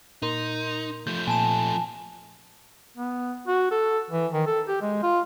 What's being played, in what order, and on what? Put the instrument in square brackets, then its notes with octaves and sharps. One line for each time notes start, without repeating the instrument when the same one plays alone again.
[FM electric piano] A#2 A#4 C6 [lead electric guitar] D#4
[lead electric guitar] F3 A3 [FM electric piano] G6
[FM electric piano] A#2 [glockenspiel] G#5 A5 E7
[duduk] B3
F#4
A4
E3
D#3
A4
G4
G#3
F4